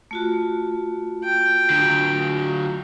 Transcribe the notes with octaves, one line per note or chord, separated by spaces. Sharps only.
A3 F4 F#4
G5
D3 F#3